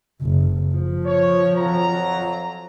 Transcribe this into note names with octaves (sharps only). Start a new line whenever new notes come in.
F#1
F3
C#5
F2 F#3 A#5